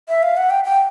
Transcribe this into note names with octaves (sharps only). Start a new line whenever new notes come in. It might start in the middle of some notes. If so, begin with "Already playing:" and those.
E5
F5
F#5
G5
G5